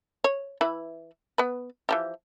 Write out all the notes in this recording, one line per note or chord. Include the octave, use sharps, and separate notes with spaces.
C#5
E3 E4 B4
B3 B4
E3 F3 G4